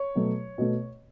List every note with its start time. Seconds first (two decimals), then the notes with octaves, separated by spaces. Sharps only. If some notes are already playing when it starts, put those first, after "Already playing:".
Already playing: C#5
0.15 B2 F#3 A3
0.58 B2 A3